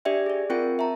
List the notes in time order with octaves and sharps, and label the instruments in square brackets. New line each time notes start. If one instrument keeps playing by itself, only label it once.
[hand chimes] D4 G4 D5 E5 G5
G#4 D5
C4 F4 A#4 G5
E5 A5 A#5